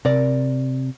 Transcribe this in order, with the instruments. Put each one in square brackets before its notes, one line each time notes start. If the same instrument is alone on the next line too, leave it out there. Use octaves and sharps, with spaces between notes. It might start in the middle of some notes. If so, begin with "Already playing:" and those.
[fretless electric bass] C3 [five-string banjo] A#4 D5